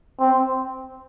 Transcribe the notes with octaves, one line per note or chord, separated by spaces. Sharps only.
C4